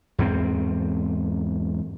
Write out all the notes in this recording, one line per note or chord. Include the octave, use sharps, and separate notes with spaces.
E2 G#2 G#3 C4